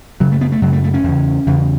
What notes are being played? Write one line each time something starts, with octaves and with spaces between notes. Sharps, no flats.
F#2 C#3 F#3
A3
B3
A3
F#2 C#3 F#3
A3
A3
C#4
E2 C#3
E2 C#3